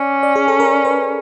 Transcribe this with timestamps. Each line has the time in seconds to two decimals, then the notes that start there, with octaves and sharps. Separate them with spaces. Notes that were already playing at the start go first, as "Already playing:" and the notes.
Already playing: C#4 D5
0.23 D5
0.36 G#4
0.48 A4
0.60 A#4
0.85 B4